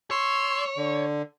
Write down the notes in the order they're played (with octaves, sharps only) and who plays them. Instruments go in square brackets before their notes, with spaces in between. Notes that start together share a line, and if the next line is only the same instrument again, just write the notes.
[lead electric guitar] C#5 [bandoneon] C6 E6
[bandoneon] D3